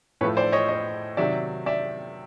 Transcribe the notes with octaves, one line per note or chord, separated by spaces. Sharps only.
A2 F3 A3 B4 C#5
C5 D5
C#5 D#5
C#5 D#5
C3 D#3 F#3 D5 E5
D5 E5